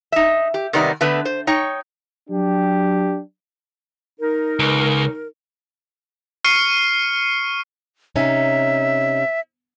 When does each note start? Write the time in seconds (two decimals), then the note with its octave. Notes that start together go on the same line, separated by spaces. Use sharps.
0.12 D#4 E5
0.54 G4
0.73 C3 D#3 G3 B3 D#4 D5
1.01 D3 A3 B3 B4
1.25 C5
1.47 D#4 C#5 G5
2.29 F#3 D4 G4
4.19 D#4 A#4
4.59 C#2
6.45 C#6 F6 C7 C#7 D#7
8.16 C3 C#4 D#4 E5